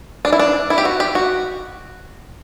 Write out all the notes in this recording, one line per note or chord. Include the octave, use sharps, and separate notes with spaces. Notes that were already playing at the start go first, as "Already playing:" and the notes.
D4
E4
D4
E4
G4
F#4
G4
F#4